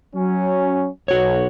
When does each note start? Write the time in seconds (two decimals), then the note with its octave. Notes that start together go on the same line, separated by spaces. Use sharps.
0.15 F#3 C#4
1.08 B1 F#4 C#5